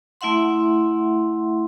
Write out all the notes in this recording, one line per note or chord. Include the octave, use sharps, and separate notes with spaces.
A3 E4 E5 F#5 C6